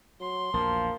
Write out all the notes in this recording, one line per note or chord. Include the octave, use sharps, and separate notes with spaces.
F#3 C6
A#1 E2 F3 A#3